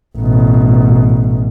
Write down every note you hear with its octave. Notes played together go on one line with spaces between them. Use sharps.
A1 B2